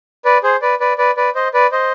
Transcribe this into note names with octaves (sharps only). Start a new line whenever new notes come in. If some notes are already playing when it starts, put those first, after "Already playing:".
B4 D5
G#4 C5
B4 D5
B4 D5
B4 D5
B4 D5
C5 D#5
B4 D5
C5 D#5